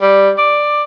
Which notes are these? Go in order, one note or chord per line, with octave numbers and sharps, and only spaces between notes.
G3
D5